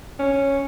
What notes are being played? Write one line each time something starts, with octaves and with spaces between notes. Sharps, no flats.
C#4